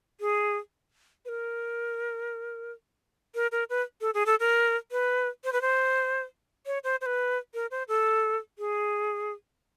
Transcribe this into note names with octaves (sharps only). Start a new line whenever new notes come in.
G#4
B4
A#4
A#4
A#4
B4
A4
G#4
A4
A#4
B4
C5
B4
C5
C#5
C5
C5
B4
A#4
C5
A4
G#4